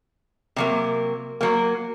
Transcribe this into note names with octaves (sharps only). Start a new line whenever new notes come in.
C3 F#3 A#3
F#3 A#3